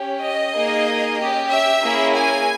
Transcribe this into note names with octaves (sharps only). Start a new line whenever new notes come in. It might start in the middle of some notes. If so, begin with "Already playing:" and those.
Already playing: C#4 G4
D#5
A#3 D#4 G#4
C#4 G4
E5
A#3 C#4 E4 G#4
G#5